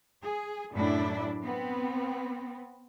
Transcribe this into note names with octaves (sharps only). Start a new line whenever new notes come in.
G#4
F#2 A2 D4 E4
B3 C4